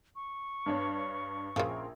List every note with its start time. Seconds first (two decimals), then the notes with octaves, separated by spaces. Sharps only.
0.16 C#6
0.66 G2 D4 C#5
1.56 A#1 C#3 F3 A#4 C6